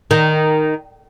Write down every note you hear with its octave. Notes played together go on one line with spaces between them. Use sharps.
D#3